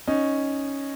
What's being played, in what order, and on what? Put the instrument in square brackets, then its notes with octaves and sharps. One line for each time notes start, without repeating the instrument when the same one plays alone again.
[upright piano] C#4 D#4